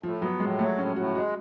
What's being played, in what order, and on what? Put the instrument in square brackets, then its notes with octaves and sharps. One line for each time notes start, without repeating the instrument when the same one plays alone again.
[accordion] A2 [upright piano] F3
[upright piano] F#3 [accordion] B3
[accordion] A2 [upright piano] G#3
[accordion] F#3 [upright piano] A3
[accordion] A2 [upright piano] C#4
[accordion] A2 [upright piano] F#4
[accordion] G#3 [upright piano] F#4